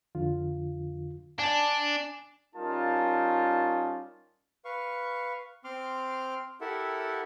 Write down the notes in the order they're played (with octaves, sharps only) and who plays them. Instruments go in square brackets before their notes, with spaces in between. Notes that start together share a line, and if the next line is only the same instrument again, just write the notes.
[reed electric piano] F2 D3 F4
[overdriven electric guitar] D4 [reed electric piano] G#5
[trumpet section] G3 C#4 D#4 F4 A#4 A5
[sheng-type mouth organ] B4 F5 C#6
C4 C6 D6 F6
E4 G4 A4 A#4 E5 F#5